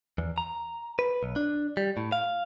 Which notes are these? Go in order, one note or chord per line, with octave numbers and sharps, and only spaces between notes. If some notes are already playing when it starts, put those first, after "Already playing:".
E2
A#5
B4
B1
D4
G3
A2
F5